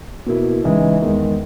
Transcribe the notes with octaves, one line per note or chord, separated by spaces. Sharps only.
B2 A#3 E4
C#3 E3 G#3 D#4
E2 D#3 G#3